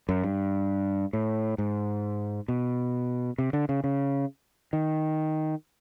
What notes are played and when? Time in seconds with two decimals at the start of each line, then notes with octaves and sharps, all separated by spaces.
0.09 F#2
0.24 G2
1.13 A2
1.58 G#2
2.48 B2
3.38 C3
3.53 D3
3.69 C#3
3.84 C#3
4.73 D#3